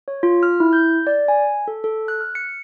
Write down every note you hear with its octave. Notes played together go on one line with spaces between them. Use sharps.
C#5
F4
F6
E4
G6
D5
G#5
A4
A4
F#6
F6
C#7